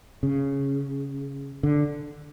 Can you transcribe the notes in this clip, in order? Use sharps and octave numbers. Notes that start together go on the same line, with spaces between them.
C#3
D3